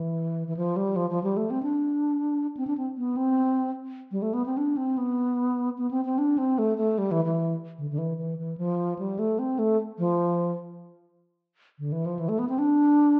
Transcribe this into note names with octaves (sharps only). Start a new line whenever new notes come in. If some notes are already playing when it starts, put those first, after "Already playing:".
Already playing: E3
E3
F3
G3
F3
F3
G3
A3
C4
D4
C4
D4
C4
B3
C4
G3
A3
B3
C4
D4
C4
B3
B3
C4
C4
D4
C4
A3
A3
G3
E3
E3
D3
D3
E3
E3
E3
F3
G3
A3
C4
A3
F3
D3
E3
F3
E3
A3
B3
C4
D4